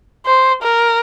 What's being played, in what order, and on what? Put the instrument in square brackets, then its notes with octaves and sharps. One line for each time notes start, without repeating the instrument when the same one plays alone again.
[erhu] C5
A#4